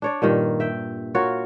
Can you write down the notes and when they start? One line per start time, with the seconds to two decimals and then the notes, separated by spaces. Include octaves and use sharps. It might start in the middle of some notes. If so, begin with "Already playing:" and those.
0.02 D4 C#5 D5
0.22 G2 A#2 D#3
0.60 E5 G5
1.15 F4 F#4 A#4 C#5